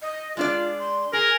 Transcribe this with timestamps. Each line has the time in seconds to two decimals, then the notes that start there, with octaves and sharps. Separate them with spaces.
0.02 D#5
0.37 G#3 D4 F4 D5
0.79 C6
1.13 G#4 A#4 G#5